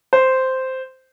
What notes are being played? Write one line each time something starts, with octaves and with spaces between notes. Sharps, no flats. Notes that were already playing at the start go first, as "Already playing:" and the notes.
C5